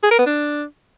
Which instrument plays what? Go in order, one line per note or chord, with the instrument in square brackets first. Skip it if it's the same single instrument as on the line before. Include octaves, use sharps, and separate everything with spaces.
[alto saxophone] G#4
A#4
B3
D4